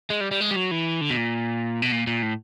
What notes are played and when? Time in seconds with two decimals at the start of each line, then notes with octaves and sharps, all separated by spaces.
0.10 G#3
0.21 G3
0.31 G3
0.41 G#3
0.51 G3
0.56 F#3
0.71 E3
1.01 D3
1.10 B2
1.17 A#2
1.82 B2
1.92 A#2
2.07 A#2
2.22 A2